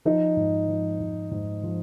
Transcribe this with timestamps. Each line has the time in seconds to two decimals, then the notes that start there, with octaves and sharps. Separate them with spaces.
0.05 F3 D#4
0.37 G#2
0.68 F3
1.00 G#2
1.31 G#2
1.63 F3